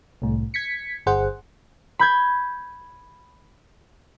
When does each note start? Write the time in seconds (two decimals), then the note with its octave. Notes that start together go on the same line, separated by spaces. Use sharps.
0.22 C2 A2
0.54 G#6 B6 C#7
1.06 G1 G#4 C5 F#5
1.99 B5 G6 G#6